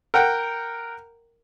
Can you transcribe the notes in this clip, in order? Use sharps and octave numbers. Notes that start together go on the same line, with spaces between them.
A#4 F#5 G5